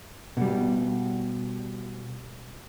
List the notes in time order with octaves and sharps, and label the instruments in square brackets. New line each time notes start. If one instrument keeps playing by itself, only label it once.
[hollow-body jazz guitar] B2 G3